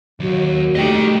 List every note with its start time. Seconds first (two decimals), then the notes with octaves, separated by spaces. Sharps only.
0.20 D#2 F#3
0.76 G3 A3 D#4 G4 D#5 G5